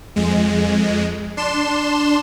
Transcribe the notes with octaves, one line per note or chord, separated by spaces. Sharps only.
F2 G#3
D4 C6 E7